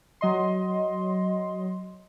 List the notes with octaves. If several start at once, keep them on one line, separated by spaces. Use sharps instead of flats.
F#3 D#5 C6